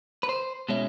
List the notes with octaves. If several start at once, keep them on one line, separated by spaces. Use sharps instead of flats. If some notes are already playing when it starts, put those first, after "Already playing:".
B4
C5
B2 G#3 C#4 E4